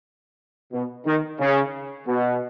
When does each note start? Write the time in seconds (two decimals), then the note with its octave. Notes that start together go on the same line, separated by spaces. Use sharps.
0.73 B2
1.06 D#3
1.39 C#3
2.07 B2